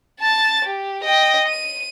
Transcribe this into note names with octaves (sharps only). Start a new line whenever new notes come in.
A5 A6
G4
D#5 G5
D#7